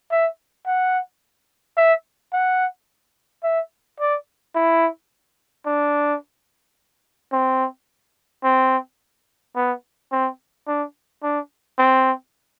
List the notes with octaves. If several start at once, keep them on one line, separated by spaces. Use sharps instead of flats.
E5
F#5
E5
F#5
E5
D5
E4
D4
C4
C4
B3
C4
D4
D4
C4